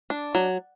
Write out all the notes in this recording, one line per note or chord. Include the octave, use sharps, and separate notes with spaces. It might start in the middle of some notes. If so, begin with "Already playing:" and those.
D4
F#3